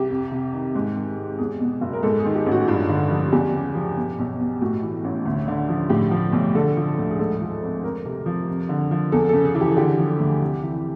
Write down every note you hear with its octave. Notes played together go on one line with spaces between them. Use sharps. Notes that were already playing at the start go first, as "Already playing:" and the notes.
Already playing: C2 G4
F2
C3
D#3
G#2
D#3
G#1
E2 G#4
B2
F#1
A#4
G#2 A4
G#4
D#3
G4
A1
F#4
G2 F4
D3
F3
E2 G4
C#3
F3
B2
B1
B2
A2 F#4
E3
A1
D2
D3
F3
A2 G4
F3
B1
D3 A4
F3
D2
G#4
G#2 A4
F3
G#1
F2 A#4
C3
F3
F2
D3
F3
E2 A4
C#3 A4
G#4
E3
G4
D3 G4
F3
D2
C3
E3